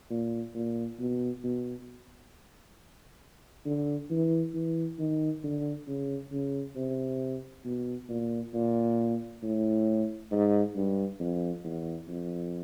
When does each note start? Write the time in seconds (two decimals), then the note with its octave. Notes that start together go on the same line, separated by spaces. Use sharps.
0.10 A#2
0.55 A#2
1.00 B2
1.44 B2
3.65 D3
4.11 E3
4.54 E3
4.99 D#3
5.43 D3
5.87 C#3
6.32 C#3
6.76 C3
7.65 B2
8.09 A#2
8.54 A#2
9.43 A2
10.31 G#2
10.76 G2
11.20 F2
11.64 E2
12.08 F2